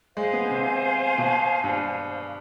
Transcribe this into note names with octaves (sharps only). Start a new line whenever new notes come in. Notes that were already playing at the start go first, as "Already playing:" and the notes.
G#3 C5 F5 G#5
B3
C3
B2
G2